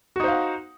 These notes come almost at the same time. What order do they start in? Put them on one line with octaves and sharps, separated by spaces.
F#4 D#4 C5 F5 F#5